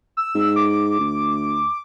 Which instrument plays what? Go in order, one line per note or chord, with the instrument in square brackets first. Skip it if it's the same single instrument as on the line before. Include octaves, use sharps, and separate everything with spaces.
[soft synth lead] E6
[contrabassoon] G#2
[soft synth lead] D6
[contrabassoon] D2